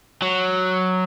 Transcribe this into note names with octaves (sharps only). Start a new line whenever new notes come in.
F#3